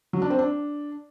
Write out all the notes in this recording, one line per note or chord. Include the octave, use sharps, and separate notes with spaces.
F#3
D4
C4
D4